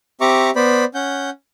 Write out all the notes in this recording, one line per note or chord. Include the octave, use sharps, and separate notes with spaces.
C4 G4 E5 A#5 C#6 D6
B3 C5 D5 B5
C#4 F#5 G6